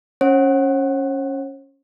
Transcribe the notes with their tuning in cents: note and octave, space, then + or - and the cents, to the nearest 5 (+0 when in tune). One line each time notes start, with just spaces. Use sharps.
C#4 +0 C#5 -45 F#5 +0